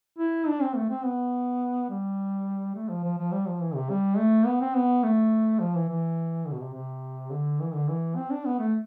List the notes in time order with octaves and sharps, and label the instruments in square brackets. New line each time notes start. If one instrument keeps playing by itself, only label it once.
[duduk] E4
D4
C4
A3
C4
B3
G3
A3
F3
F3
F3
G3
F3
E3
C3
G3
A3
B3
C4
B3
A3
F3
E3
E3
D3
B2
C3
C3
D3
E3
D3
E3
C4
D4
B3
A3